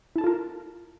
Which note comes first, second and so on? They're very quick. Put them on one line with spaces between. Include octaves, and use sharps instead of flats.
E4 A5 A4 F4 A#4